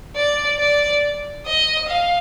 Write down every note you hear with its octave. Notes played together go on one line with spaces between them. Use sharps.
D5
D5
D#5
F5